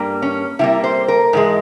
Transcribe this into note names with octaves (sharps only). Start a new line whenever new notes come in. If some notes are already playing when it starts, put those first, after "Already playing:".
Already playing: G2 G3 A#3
C#4
C3 G3 A#3 E4
C5
A#4
G#2 E3 G#3